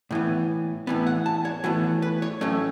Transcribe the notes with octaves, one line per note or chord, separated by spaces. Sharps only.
A2 E3 B3
A2 E3 B3
F#5
A5
C#5
A2 E3 B3 F#4
B4
C#5
A2 F#3 A3 C#4 C#5